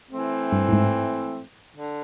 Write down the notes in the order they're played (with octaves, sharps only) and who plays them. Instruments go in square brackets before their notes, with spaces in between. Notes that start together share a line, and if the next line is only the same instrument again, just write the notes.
[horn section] E3 A3 C4
[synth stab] G2
A2
G#2
[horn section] D3